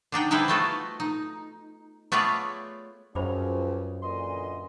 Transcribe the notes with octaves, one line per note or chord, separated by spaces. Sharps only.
D3 D4 D#4 G5
G3 D#4 E4 G#4 B4 C5
A3 B3 F4 F#4 A4
D#4
A3 B3 F4 G#4 C#5 D5
C#2 F#2 F3 C4 C#4 C5 B5 D6
A#2 D3 E3 D#5 C6